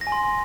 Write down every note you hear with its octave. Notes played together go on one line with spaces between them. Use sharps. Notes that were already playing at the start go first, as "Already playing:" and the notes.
A#6
G#5
C6